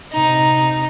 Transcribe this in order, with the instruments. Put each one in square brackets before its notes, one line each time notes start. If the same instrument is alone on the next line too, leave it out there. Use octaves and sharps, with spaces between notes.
[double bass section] C3 [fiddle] D#4